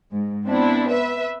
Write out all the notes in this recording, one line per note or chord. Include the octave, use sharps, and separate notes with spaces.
G#2
B3 C4 D4 E4
B4 E5